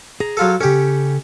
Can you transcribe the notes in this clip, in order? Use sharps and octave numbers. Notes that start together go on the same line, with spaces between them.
G#4 A#5
F#3 F4 A4
C#3 C#4 G4 A4